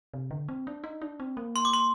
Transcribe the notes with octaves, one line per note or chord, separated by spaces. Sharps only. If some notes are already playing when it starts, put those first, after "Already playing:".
C3
D3
C4
D4
D#4
D4
C4
A#3
C6
D6
C6